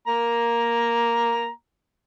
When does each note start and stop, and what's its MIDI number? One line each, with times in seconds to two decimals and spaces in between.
0.07 1.49 58
0.07 1.49 82